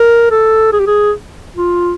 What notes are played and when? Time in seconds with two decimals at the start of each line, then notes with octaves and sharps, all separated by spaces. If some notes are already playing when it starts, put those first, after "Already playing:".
Already playing: A#4
0.31 A4
0.73 G#4
0.80 G4
0.87 G#4
1.57 F4